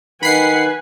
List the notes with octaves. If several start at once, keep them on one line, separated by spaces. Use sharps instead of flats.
D#3 B4 F#5 G#5 B5 C7